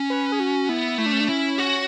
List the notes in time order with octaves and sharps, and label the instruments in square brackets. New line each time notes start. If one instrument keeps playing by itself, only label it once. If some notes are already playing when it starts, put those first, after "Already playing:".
Already playing: [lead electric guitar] C#4
[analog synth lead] B4
G#4
F#4
[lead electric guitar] B3 [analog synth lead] E4
[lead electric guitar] A3 [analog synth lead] E4
[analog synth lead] D4
C#4
D4
[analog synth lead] C#4 [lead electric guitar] E4
[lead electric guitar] F#4